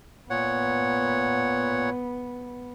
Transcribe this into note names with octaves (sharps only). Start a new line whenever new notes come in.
A#2 B3 C#5 F#5